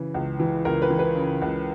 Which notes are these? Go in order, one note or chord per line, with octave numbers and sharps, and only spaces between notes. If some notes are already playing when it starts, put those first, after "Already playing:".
Already playing: C#3 E3
C#2
E3
C#2 A#4
B4
E3
B4
C#3
C#2